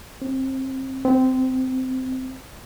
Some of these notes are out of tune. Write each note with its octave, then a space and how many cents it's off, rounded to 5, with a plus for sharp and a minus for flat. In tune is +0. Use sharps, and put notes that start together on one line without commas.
C4 +25
C4 -15